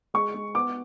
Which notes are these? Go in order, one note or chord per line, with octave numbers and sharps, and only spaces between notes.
G#3 C#6
G#3
B3 D6